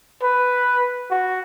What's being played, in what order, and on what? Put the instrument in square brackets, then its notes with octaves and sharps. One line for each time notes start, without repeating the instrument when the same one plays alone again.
[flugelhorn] B4
F#4